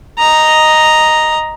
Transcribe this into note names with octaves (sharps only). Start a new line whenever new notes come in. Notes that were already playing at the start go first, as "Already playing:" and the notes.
D#5 A#5